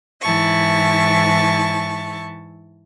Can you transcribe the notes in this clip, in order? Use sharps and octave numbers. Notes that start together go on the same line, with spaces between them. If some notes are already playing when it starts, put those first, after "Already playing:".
G#2 E3 E4 A5 C#6